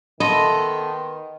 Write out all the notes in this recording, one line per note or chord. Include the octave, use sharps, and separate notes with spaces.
D#3 B3 A4 D#5 E5 B5 C6